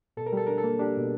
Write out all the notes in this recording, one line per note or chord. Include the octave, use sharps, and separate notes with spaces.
B2 A4
A#4
G3 A4
D4 A#4
A4
A#3
D4 G4
B2